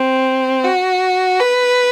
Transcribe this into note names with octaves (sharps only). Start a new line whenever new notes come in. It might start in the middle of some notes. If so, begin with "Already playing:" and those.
Already playing: C4
F#4
B4